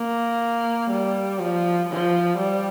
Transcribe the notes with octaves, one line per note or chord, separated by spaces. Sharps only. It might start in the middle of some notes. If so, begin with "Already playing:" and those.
Already playing: A#3
G3
F3
F3
G3